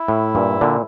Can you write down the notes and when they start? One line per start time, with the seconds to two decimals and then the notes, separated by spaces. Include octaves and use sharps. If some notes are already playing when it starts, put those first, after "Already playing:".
Already playing: E4
0.08 A2
0.35 G2 A#2
0.61 A#2 D3